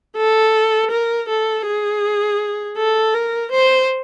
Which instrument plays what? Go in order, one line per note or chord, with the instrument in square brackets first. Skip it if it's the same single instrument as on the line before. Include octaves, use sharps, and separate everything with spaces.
[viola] A4
A#4
A4
G#4
A4
A#4
C5